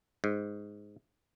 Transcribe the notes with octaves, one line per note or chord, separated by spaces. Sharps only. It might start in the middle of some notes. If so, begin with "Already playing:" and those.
G#2